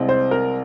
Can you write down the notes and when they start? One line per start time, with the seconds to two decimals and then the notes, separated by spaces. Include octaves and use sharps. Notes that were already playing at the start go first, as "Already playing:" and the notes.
Already playing: C2 C3 G#3 C4
0.09 C5
0.31 A#4